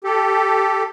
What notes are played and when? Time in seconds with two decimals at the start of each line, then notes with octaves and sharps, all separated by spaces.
0.04 G4 A4